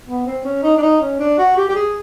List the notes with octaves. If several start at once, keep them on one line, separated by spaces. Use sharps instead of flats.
B3
C4
C#4
D#4
D4
D#4
C#4
D4
F#4
G4
G4
G#4